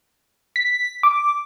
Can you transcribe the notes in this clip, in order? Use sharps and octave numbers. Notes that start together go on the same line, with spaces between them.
B6
D6